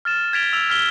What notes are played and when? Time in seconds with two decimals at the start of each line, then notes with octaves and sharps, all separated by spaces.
0.05 F6 A6 E7
0.33 G#6 A6 B6 D7 F7 G7
0.53 E6 F6 F7
0.69 E6 F6 B6 G7